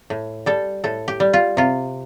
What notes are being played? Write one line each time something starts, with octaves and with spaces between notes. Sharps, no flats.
A2
G3 A4
A2 A4
G4
G3
F4
C3 F4